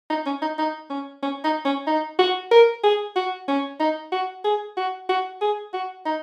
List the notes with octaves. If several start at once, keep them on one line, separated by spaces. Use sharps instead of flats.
D#4
C#4
D#4
D#4
C#4
C#4
D#4
C#4
D#4
F#4
A#4
G#4
F#4
C#4
D#4
F#4
G#4
F#4
F#4
G#4
F#4
D#4